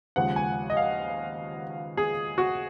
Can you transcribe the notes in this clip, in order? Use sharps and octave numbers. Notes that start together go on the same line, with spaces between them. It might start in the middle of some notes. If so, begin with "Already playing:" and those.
D#2 C#3 F3 G#3 F#5
G#5
D#5
F5
G#4
F#4